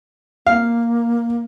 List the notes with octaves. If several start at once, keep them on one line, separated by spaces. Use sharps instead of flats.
A#3 F5